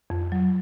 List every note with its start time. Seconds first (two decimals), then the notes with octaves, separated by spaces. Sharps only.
0.10 F2
0.32 F#3